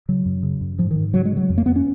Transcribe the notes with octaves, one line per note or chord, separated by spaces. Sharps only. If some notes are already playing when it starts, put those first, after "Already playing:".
C#3 F#3
F#2
C#3
F#2
G#2 F3
G#2 D#3
C#3 F#3
G#3
C#3
F#3
F2
A#3
F2 B3
C#4